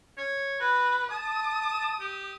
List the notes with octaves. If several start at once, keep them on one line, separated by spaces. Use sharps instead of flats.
C#5
F#4 B4
A5 D#6
G4